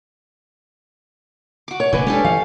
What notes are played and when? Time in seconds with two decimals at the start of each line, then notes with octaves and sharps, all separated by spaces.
1.68 F#4 D6
1.80 C#5
1.93 F1 A#2 D3 B4 D5 G#5
2.07 G#3 C#4 D4 G4 A4
2.24 E3 F5